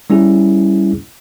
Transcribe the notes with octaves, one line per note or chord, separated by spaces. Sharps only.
G3 C#4 E4 G#4